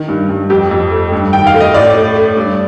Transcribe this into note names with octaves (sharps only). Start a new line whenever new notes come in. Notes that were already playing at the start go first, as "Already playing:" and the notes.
Already playing: D#3
G2
G2
F2 G4
F2
A3
G2
D#3 G5
F5
A3
D#5
A2 D5
A3
A3
G2